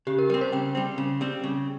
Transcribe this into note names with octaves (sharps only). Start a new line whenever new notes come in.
C#3 G4
A#4
G3 C4 A#4
C5
C#3 G5
G3 C4
C#3
G3 C4
C#3